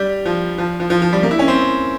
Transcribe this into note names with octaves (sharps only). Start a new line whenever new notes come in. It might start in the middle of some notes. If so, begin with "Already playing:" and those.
Already playing: G3
F3
F3
F3
F3
F3
G3
A#3
E4
C#4
C4